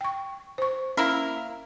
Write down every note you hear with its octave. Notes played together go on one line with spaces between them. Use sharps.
G5 C#6
C5 C#6
A#3 C#4 E4 A#4